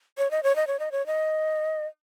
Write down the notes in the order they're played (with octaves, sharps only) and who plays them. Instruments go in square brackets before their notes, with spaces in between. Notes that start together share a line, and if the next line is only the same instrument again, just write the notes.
[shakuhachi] C#5
D#5
C#5
D#5
C#5
D#5
C#5
D#5